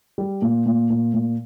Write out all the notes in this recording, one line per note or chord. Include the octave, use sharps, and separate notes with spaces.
G3
A#2
A#2
A#2
A#2